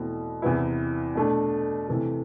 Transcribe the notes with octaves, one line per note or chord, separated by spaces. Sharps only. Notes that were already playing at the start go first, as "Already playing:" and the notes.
Already playing: E2 B2 A3 C4 E4
E2 C3 E3 B3 E4
B2 A3 D4
C3 E3 A3